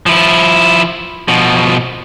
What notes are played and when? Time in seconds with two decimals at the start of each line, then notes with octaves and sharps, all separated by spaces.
0.06 F3 E4
1.28 B2 F3